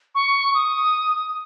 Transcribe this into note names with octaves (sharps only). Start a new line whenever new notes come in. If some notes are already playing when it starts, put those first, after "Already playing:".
C#6
D#6